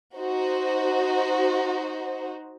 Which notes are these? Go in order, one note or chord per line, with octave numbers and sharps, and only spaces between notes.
D#4 F#4 C5